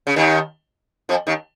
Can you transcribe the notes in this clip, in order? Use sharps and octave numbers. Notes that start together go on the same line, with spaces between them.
C#3
D#2 D#3
F2 F3
D#2 D#3